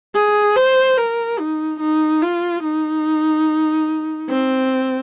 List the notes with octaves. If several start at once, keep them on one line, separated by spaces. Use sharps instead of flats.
G#4
C5
A#4
D#4
D#4
F4
D#4
C4